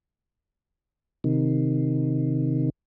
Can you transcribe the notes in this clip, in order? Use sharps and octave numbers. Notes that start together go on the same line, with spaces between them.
C3 D#3